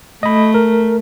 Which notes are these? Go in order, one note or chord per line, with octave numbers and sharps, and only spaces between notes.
A3 D#5 B5
A#4